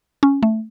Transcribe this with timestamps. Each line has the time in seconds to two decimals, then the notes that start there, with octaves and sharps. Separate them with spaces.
0.23 C#4
0.43 A3